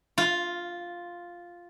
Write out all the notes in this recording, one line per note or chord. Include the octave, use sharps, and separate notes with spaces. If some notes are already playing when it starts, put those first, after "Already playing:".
F4